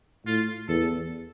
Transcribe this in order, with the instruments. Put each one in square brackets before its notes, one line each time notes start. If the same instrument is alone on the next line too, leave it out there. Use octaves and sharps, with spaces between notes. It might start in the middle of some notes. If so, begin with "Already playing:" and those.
[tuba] A2 [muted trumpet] F4
[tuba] E2 [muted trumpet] A4